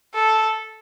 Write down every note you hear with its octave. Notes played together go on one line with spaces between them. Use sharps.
A4